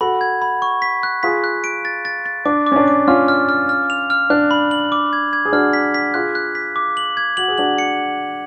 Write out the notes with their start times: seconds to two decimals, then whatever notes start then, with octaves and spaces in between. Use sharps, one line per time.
0.01 F#4 A4 B5
0.21 G#6
0.42 B5
0.62 C#6
0.82 B6
1.03 F#6
1.23 F4 G#4 B6
1.44 F#6
1.64 D7
1.85 A6
2.05 A6
2.26 A6
2.45 D4 D6
2.66 D6
2.72 C#4
2.76 D4
2.88 D6
3.08 C#4 F4 F6
3.28 F6
3.49 F6
3.69 F6
3.90 F7
4.10 F6
4.30 D4 F#6
4.51 B5
4.71 F#7
4.92 D6
5.13 G#6
5.33 G#6
5.45 G#4
5.53 D4 F#4 F6
5.73 B6
5.94 B6
6.14 F4 G#4 F#6
6.35 F#6
6.55 B6
6.76 D6
6.97 F#7
7.17 G#6
7.37 F#4 F#7
7.48 G#4
7.58 D4 F#4 F#7
7.78 C#7